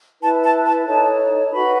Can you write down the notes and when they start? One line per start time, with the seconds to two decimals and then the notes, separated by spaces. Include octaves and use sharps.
0.22 E4 B4 A5
0.43 A5
0.65 A5
0.86 D#4 A4 C#5 A5
1.51 F#4 B4 B5